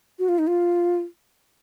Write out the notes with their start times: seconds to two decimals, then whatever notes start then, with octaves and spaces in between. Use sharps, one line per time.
0.19 F#4
0.29 F4
0.39 D#4
0.47 F4